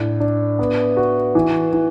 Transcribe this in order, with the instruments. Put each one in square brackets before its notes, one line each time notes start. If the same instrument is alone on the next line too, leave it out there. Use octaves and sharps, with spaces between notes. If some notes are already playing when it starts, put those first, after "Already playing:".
Already playing: [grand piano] A2 D4
D4
B3
F#4
E3
E3